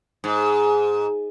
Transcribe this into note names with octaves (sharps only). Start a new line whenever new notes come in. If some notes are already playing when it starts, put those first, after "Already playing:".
G#2